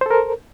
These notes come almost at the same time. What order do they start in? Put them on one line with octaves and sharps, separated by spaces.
C5 A4 A#4